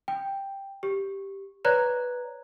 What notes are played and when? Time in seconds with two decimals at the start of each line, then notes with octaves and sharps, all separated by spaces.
0.08 G5
0.83 G4
1.65 B4 C#5 D5 A#5 F#6 G#6